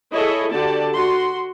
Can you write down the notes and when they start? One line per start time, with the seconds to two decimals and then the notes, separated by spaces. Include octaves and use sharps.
0.14 E4 G#4 A4 C#5 D#5
0.52 D3 F#4 G4 D5 A5
0.93 F#4 C6